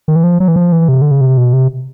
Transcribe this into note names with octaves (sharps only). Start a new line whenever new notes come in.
D#3
E3
F3
F#3
E3
F3
E3
C3
D3
C#3
C3
B2
C3